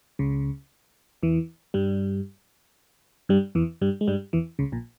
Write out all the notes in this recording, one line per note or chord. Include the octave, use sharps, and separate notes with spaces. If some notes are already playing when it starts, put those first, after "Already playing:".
C#2 C#3
E2 E3
G2 G3
G2 G3
E2 E3
G2 G3
G#3
G2 G3
E2 E3
C#2 C#3
A#1 A#2